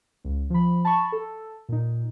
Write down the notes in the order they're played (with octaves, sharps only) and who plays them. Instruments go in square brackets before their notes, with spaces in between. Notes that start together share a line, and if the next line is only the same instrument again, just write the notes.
[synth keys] C#2
F3 B5
A5 B5 C#6
A4
A#2 D#4